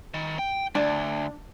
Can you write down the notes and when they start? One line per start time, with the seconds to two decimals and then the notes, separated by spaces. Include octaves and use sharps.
0.14 D#3
0.39 G5
0.75 D2 D4